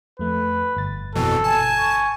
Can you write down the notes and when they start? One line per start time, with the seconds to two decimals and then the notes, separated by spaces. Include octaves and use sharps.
0.19 F2 A3 B4
0.77 G1 A6
1.15 F2 B2 E3 A4
1.44 G#5 A5
1.79 C#6